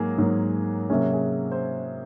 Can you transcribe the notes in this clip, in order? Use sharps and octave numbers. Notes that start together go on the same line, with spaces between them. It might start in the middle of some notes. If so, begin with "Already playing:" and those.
Already playing: G#2 F#3 A#3 G#4
G#2 F#3 A#3
C3 F#3 A#3 C#4 G#4
G#4
C5